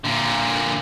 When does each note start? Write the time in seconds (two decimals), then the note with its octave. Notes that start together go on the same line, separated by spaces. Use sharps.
0.04 A#2 D3